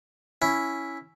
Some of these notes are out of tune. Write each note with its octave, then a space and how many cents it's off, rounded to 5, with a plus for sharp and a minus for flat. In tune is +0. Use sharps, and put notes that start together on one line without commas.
C#4 +0 E4 +0